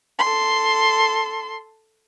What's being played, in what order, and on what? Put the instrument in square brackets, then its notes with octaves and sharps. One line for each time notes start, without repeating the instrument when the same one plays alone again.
[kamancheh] A4 C6